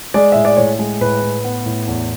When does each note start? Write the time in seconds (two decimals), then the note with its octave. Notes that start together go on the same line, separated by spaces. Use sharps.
0.14 G#3 D5
0.32 A2 E5
0.45 D5
0.57 A2 C#5
0.79 G#3
1.01 A2 B4
1.22 A2
1.44 B3
1.66 A2
1.87 E2